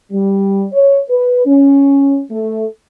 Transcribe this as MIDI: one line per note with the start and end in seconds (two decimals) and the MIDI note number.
0.12 0.65 55
0.73 0.99 73
1.09 1.45 71
1.46 2.20 61
2.31 2.66 57